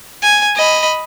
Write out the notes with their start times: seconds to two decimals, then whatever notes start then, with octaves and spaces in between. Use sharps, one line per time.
0.22 G#5
0.56 D#5 B5